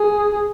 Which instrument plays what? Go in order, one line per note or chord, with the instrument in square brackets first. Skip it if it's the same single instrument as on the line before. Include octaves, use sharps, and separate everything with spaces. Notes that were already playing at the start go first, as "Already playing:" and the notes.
Already playing: [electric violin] G#4